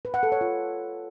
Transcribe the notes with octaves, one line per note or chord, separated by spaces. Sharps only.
B4
F#5
A4
C#5
F4